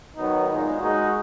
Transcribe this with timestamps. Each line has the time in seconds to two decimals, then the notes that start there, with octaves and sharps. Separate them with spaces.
0.16 D#3 F#3 B3 D#4
0.49 A#2 G#3 D#4
0.80 G#3 D#4 F#4